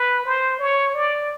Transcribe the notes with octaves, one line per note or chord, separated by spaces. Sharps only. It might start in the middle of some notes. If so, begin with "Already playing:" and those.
Already playing: B4
C5
C#5
D5